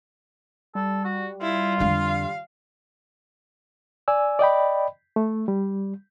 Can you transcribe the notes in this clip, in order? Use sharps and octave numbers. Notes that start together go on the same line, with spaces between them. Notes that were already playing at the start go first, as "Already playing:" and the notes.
G3 A4
F#4
E4 F4
F2 D3 F5
D5 G#5 E6
D5 D#5 G5 B5
A3
G3